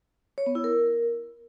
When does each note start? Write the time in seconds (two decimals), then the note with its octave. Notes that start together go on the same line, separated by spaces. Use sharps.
0.38 C#5
0.46 B3
0.55 E4
0.64 A#4